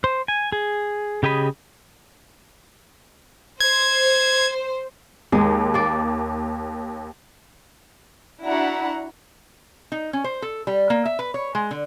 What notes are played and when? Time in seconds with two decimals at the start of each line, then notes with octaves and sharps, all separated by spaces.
0.04 C5
0.28 G#5
0.52 G#4
1.23 C#3 G4 G#4 D#5 B5
3.61 C5 G#6
5.32 D#2 G#3
5.74 A#3 D5
8.45 D4 E4 F#4 F#5 A#5
9.92 D#4
10.13 C#4
10.24 C5
10.42 A4
10.67 G3
10.90 A#3
11.06 E5
11.19 B4
11.34 C#5
11.55 G#3
11.71 D3